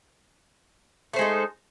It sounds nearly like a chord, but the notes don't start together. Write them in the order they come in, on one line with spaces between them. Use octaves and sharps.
A3 C5 G#3 D#4